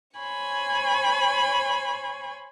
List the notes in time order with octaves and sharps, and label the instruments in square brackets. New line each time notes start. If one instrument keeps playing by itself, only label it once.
[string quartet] C5 C#5 G#5 B5 C#6